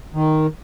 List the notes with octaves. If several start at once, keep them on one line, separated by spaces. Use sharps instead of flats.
D#3